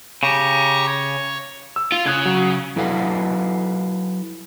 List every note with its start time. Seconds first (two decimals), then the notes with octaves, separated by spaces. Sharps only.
0.23 C#3 G4 A#5 C#6
0.87 C#5
1.76 E6
1.92 F4
2.06 C#3 D#6 F#6 G#6
2.26 F#3
2.76 F#3 E4 A4 B4 F5 F#5